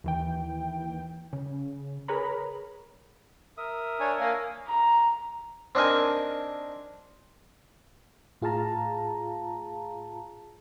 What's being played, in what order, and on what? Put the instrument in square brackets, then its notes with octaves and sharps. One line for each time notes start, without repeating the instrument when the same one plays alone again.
[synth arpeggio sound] D#2 E3 G5
C#3
G#4 A#4 B4 C#5 A#5 B5
[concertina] A#4 E5 D#6
[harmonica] D4 C#5 G#5
A#3 F5 G#5
[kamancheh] A#5
[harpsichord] C4 D4 D#4 A#4 G#5
[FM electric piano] A2 F4 G#4 F5 A5 A#5